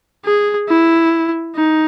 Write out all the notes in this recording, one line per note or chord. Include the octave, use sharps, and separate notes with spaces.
G#4
E4
D#4